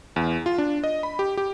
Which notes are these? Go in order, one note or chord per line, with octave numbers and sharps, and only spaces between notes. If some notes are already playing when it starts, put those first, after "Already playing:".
E2
F4
D4
D#5
B5
G4
G4